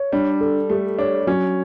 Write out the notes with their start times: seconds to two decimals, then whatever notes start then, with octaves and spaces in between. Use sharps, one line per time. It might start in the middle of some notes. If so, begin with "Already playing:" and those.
Already playing: C#5
0.12 G3 D4
0.41 A4
0.70 G3 A3
0.98 D4 C#5
1.27 F#3 C#4